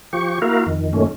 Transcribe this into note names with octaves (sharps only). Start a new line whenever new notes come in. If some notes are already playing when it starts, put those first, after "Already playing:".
F3 G4 C#6
A#3 E4 F#4 A#4 F5
F2 D#3
F#2 A#2 D#3 A3 C#4